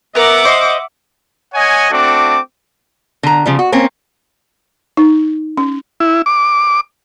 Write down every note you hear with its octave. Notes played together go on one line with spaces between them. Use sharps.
B3 A#4 E5 F#5 D6
C5 D#5
C#5 D#5 F#5 G#5
A3 C4 D4 F#4 D6
D3 A#5
C#3 F3 G3
F#4
A#3 C4 C#4
D#4
C#4
E4
D6